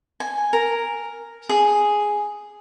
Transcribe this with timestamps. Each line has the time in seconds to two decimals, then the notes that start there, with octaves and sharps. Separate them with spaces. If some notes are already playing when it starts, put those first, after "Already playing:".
0.20 G#5
0.53 A#4
1.49 G#4